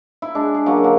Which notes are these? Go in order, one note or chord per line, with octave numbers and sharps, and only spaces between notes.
E4
G#3 D4
G#4
F#3 G#3 A#3 C#4
D3